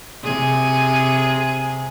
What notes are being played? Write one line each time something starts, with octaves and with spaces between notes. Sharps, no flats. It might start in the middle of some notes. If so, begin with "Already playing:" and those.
C3 G#4